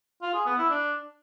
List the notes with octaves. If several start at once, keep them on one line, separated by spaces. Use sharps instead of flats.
F4
G#4
B3
E4
D4